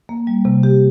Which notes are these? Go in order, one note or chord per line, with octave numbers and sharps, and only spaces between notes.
A#3
G3
C3
G4